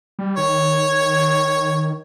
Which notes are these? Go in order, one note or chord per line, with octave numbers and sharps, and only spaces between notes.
G3
D#3 C#5